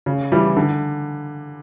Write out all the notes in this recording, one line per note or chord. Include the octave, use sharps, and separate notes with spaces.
C#3
E3 G3
D3